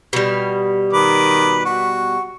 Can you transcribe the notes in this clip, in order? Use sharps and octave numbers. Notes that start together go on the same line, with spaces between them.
B2 G3
D#3 B4 D6
F#4